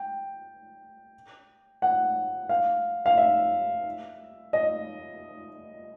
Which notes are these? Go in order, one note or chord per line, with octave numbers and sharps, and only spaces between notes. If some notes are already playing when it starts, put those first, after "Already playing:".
Already playing: G5
F#5
F5
F5
E5
D#5